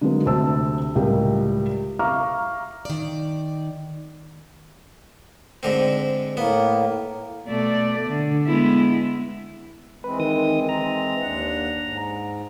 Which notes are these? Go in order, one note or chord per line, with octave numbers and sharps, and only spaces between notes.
D3 F#3 G#3 A#3 B3
D2 C3 C4 C5 A5 E6
C#2 A2 G3 G4 A#4 G5
E5 F5 A#5 C#6 D6 F6
D#3 D5
G#2 D3 C4
A2 A#3 B3
B2 A3 D5
D3
G#3 B3 E4
E3 G#3 C4 B4
D#3 D#6
A#5
D#2 D4 F#5
G#2